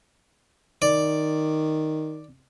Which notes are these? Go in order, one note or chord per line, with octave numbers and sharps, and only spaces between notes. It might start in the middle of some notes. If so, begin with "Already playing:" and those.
D#3 D5